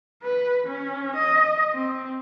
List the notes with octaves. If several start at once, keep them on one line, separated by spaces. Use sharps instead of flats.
B4
C#4
D#5
C4